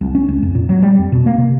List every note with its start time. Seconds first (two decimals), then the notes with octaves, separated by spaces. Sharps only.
0.01 C2
0.15 C#4
0.28 C#2
0.43 F2
0.55 A#2
0.69 F#3
0.82 G3
0.98 F2
1.12 B2
1.26 A#3
1.38 C3